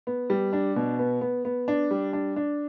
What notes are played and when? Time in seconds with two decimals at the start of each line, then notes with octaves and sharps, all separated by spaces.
0.07 B3
0.30 G3
0.53 D4
0.76 B2
0.99 B3
1.21 B3
1.45 B3
1.68 D4
1.91 G3
2.13 D4
2.36 D4